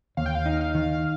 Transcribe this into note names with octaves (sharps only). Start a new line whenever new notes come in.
D#2 F5
G5
F5
D#4
F5
D#3